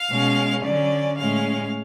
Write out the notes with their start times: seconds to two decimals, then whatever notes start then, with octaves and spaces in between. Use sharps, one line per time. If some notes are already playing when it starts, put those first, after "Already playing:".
Already playing: F5
0.10 B2 G#3 C#4
0.64 D3 F#3 C#4 D5
1.18 A2 G#3 C#4 F5